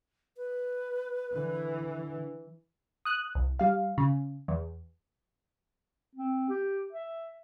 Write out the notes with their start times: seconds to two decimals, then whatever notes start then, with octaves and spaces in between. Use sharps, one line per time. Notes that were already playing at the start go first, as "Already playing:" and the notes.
0.37 B4
1.35 D3 E3
3.05 D#6 F#6
3.35 C2
3.59 G3 F5
3.98 C#3
4.48 E2
6.15 C4
6.49 G4
6.92 E5